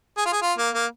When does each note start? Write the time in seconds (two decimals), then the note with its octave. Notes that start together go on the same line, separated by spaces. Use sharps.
0.18 G#4
0.25 F4
0.33 G#4
0.42 F4
0.58 A#3
0.74 A#3